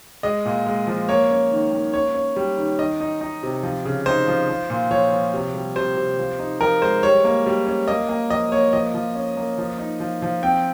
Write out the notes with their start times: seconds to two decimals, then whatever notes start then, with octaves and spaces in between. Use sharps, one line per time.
0.23 G#3 D#5
0.45 A#2
0.67 G#3
0.87 F3
1.09 A#3 C#5
1.30 C#4
1.51 D#3
1.72 A#3
1.93 C#4 C#5
2.15 C#4
2.36 G3
2.57 D#3
2.79 D#3 D#5
3.00 D#4
3.21 D#4
3.43 C3
3.63 F3
3.85 C#3
4.06 D#4 C5
4.28 F3
4.49 F3
4.70 A#2
4.91 F3 C#5
5.12 F3
5.34 C3
5.54 G3
5.76 C3 C5
5.97 C3
6.18 F3
6.39 D#4
6.61 F3 A#4
6.82 G#3 C5
7.03 G3 C#5
7.25 A#3
7.46 G3
7.67 C#4
7.88 A#3 D#5
8.09 A#3
8.30 F3 D#5
8.52 A#3 C#5
8.73 F3 D#5
8.94 F3
9.15 C#4
9.37 A#3
9.58 F3
9.79 D#4
10.00 F3
10.22 F3
10.42 C4 G5